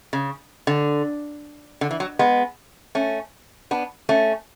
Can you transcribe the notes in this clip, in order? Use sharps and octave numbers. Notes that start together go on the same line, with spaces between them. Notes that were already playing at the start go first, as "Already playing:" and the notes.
C#3
D3
D3
E3
F#3
G#3 B3
A3 C#4
B3 D4
A3 C#4